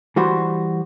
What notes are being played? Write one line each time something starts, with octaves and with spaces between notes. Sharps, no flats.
E3 G3 F#4 C5